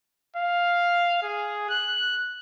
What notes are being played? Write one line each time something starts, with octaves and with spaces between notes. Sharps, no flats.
F5
G#4
F#6